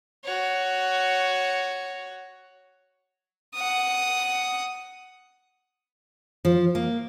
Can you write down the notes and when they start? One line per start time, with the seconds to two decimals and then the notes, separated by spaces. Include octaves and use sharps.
0.25 F#4 C#5
3.55 F#5 D#6
6.45 F3
6.75 A#3